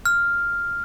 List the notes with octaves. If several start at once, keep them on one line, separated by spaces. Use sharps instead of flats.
F6